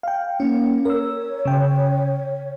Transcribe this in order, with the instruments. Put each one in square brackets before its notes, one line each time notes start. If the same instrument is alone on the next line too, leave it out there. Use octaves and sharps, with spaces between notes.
[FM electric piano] F5 G5
[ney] A#3 [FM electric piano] C#4
[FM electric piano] A#4 E6 [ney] C#5
[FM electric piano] C#3 G5